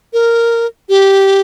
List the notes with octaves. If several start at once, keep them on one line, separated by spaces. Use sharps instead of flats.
A#4
G4